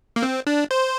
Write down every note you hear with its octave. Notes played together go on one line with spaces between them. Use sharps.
A#3
C4
D4
C5